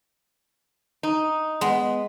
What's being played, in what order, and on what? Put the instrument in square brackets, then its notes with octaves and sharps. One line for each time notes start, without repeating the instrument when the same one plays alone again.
[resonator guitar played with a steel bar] D#4
[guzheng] G#3 [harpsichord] B3